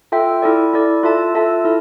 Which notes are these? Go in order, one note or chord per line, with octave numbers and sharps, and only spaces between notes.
F4 A4 E5 G5
E4 A4 D5
E4 A4 D5
F4 A4 E5 A5
F4 A4 E5 A5
E4 A4